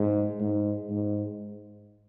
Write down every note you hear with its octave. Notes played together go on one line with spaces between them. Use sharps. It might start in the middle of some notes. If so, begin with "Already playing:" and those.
Already playing: G#2
G#2
G#2